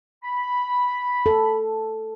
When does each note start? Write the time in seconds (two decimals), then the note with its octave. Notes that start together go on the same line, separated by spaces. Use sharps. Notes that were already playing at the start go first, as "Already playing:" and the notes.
0.24 B5
1.26 A4